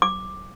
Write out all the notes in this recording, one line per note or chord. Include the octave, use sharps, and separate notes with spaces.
D6